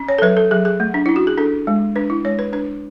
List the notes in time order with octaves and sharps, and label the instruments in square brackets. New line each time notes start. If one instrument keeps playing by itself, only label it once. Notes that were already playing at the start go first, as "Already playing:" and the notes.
Already playing: [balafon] C#4
C#5
A4
F#3 B4
A4
F#3 G#4
G#4
A3
D4
C#4 E4
F#4
G#4
D4 A4
G#3
D4 B4
E4
G#3 C#5
B4
D4 B4